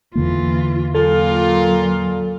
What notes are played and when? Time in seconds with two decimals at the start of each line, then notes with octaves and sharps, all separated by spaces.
0.15 E2 D3 E3 A#3 F4
0.95 A#2 F#3 F4 A4